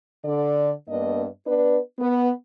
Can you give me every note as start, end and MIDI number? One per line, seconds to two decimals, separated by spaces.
0.25 0.72 50
0.25 0.72 74
0.88 1.26 43
0.88 1.26 58
0.88 1.26 59
0.88 1.26 62
0.88 1.26 75
1.47 1.79 59
1.47 1.79 62
1.47 1.79 71
1.99 2.30 59